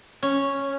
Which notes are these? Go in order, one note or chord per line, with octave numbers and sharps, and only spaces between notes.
C#4